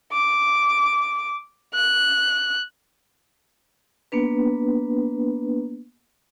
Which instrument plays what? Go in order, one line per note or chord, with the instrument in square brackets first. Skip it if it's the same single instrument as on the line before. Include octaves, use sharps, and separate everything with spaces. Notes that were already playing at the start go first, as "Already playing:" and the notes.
[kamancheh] D6
F#6
[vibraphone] A#3 B3 D4 B4